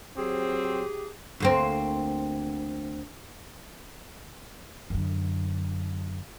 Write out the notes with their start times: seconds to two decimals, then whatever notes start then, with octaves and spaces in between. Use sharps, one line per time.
0.17 F#3 C4 G4 G#4
1.40 D2 A#3 C4
4.90 F#2 D3